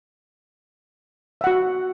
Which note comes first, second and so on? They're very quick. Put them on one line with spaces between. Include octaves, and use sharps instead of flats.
E5 F#5 F#4